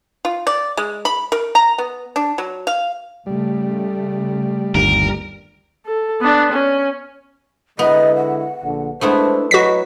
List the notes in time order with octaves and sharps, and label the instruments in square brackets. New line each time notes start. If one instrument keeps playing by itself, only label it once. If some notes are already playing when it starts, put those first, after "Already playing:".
[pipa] F4
D5
G#3
B5
A#4
A#5
B3
D4
F#3
F5
[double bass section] C#3 A3 [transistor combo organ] G3
[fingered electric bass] G1 D#2 [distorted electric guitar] A#4
[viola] A4
B3 D4
C#4
[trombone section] D3 G#3 E4 [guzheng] B3 [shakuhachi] D#5
[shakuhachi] F#5
[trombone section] A#1 D3
[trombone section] G#3 C5 [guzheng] A3 B3 E4 [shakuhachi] D4
[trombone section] F#3 B4 [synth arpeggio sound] F#4 B6 [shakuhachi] D#5